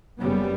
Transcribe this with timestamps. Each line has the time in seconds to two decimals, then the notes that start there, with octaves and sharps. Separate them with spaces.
0.21 F#1 F#2 C#3 G3 B3